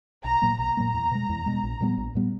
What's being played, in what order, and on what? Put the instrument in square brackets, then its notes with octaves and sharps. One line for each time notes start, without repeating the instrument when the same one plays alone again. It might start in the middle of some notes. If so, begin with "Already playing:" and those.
[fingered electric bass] B1 [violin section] A#5
[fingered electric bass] A#2 F#3 A#3
[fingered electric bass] B1 [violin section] A#5
[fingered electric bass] A#2 F#3 A#3
E2
B2 G#3
E2
B2 G#3
A#1
A#2 G3 B3
A#1
A#2 G3 B3